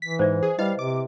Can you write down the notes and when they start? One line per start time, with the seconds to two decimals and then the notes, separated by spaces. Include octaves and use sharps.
0.02 E3 B6
0.19 G#2 C5 D5 E5
0.43 G#4
0.59 G3 E4 B4 D#5 F5
0.79 C3 D6